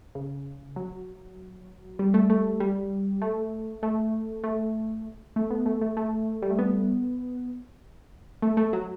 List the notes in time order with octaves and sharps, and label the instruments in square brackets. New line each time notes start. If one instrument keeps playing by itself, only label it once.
[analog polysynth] C#3
F#3
G3
A3
A3
G3
A3
A3
A3
A3
B3
A3
A3
A3
G3
A3
B3
A3
A3
F#3